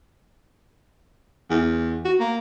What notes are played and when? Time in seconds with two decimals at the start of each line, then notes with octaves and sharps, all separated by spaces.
1.50 E2
2.05 F#4
2.20 A#3